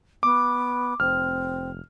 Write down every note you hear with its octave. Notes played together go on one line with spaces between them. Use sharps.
B3 D6
F1 C4 F6